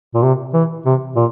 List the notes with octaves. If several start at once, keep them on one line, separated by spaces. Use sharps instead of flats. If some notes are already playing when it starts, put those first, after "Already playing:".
A#2
C3
E3
C3
A#2